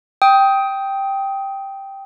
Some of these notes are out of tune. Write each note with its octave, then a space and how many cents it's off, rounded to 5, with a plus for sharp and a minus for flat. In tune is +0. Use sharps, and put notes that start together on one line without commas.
G5 +0 D#6 +20